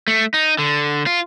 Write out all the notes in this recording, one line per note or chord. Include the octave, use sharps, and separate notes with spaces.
A3
D#4
D3
F4